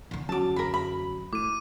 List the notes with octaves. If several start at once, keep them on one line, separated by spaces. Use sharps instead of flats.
E2 D3
F#2 F#3 A5 D6
A#4 B5
B5
A2 D6 D#7